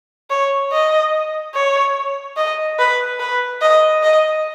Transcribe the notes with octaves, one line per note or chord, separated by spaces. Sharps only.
C#5
D#5
C#5
D#5
B4
B4
D#5
D#5